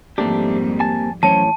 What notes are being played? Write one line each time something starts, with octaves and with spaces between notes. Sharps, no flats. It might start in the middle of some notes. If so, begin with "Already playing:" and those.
F2 G#2 G3 A3 A#3 C4 D4 G4
G#5 A5
A2 E3 F#3 C#4 C5 C#5 A5